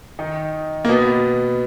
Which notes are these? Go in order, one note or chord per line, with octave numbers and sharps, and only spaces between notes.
D#3 D#4
A#3
B2 B3